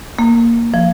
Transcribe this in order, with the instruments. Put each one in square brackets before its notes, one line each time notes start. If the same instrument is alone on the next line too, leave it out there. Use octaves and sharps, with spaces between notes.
[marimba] A#3
F3